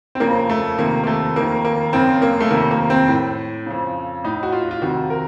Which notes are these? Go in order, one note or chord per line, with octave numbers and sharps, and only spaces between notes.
C4
F2 C#3 A#3
A3
F2 C3 D#3 A#3
A#3
A3
F2 D#3 A#3
A#3
F#2 C#3 C4
A#3
A3
F2 C3 D#3 A#3
A#3
C4
A2
F2 C#3
A2 D#4
F#4
F4
F4
F2 C3 D#3 F#4
A#4